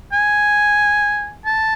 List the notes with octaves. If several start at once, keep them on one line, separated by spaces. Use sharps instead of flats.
G#5
A5